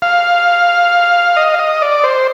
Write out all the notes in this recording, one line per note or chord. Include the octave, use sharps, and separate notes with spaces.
F5
D#5
F5
D#5
D5
C5